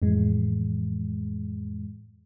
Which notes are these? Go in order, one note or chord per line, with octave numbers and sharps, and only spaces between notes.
F2 A2 E3 G#3